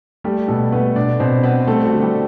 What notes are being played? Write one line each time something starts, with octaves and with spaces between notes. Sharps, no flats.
G3 A3 G4
B2 A3 A4
A3 B3 B4
B2 D4 D5
B2 C4 C5
B3 C4 B4
G3 A3 A4
F#4
D3
G3 G4